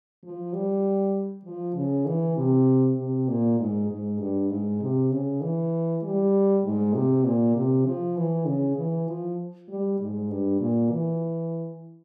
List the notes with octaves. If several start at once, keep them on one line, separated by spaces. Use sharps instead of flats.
F3
G3
F3
C#3
E3
C3
C3
A#2
G#2
G#2
G2
G#2
C3
C#3
E3
G3
G#2
C3
A#2
C3
F3
E3
C#3
E3
F3
G3
G#2
G2
A#2
E3